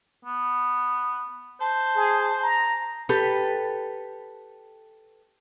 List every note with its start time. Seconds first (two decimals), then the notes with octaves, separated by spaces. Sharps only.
0.25 B3
1.60 C5 A5
1.96 G#4
2.43 A#5
3.09 G4 A4 B4